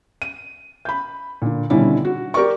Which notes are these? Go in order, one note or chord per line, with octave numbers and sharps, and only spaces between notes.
D#7
B5 G6
A#2 D3
B2 D3 D#3 G3 C#4 E4
F#4
G4 A#4 D5 C#6